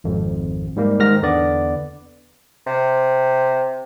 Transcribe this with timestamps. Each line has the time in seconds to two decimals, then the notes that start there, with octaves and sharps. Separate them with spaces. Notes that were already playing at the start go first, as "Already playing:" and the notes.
0.04 G#1 F2
0.76 G#2 G3 A#3
0.99 G#2 D#3 F6 A#6
1.22 E2 D3 B3 D5
2.67 C3